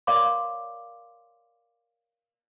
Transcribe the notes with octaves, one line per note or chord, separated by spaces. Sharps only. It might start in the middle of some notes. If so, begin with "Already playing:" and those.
A#4 C#5 D5 F5 C6 D6